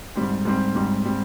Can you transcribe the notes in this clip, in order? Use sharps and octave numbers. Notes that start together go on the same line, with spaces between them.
G#2 G3 C4
G#2 G3 C4
G#2 G3 C4
G3 C4